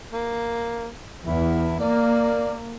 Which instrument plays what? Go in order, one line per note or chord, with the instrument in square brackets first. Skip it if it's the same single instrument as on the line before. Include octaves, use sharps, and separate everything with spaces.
[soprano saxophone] A#3
[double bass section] E2 [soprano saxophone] E4
[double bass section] A#3 [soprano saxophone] D5